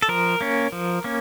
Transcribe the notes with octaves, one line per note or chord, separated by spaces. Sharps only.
A4
F3 A#4
A#3 C#4
F3
A#3 C#4